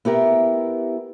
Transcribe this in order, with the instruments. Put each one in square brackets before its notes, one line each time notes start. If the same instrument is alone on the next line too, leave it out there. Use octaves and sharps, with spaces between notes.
[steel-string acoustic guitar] B3 E4 G4 A#4